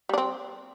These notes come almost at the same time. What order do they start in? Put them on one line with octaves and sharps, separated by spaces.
G3 D4 C4